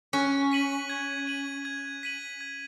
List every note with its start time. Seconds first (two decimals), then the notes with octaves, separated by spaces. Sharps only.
0.13 C#4 F#6
0.51 B6 D#7 F#7
0.89 G#6
1.27 D#7 F#7
1.65 G#6
2.03 B6 D#7 F#7
2.41 G#6